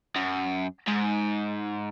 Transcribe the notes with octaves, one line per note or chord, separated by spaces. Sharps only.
F#2
G#2